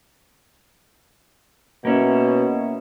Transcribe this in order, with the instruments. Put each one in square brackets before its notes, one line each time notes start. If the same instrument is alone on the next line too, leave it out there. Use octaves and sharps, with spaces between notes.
[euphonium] B2 [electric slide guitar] A#3 C#4 E4